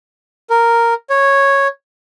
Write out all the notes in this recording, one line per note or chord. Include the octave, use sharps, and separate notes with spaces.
A#4
C#5